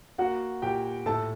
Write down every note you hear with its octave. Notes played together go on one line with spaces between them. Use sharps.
A#3 F#4 F#5
A#2 G4 G5
A2 A4 A5